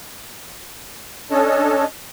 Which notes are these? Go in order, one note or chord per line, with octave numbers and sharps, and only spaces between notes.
C#4 D4 A4 C#5 D#5 A5